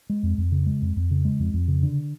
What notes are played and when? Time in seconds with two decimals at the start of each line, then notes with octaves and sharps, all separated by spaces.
0.10 G#3
0.23 F2
0.38 F2
0.52 C#3
0.66 G#3
0.82 F2
0.96 F2
1.11 C#3
1.25 G#3
1.39 F2
1.54 F2
1.68 C#3
1.83 D3